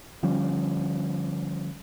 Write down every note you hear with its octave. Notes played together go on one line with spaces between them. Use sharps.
D3 F3 G3 C#4